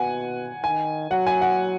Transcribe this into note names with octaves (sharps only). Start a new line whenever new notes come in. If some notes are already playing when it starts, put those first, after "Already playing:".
Already playing: B2 F#5 G#5
D#3 G#5
F#3 F#5
G#5
F#5